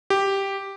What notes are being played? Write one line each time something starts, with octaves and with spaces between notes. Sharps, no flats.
G4